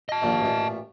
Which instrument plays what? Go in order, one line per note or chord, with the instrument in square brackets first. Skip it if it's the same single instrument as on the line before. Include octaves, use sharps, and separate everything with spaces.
[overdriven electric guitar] D#5 A5
[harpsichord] A#1 D#2 A#2
A1 A#2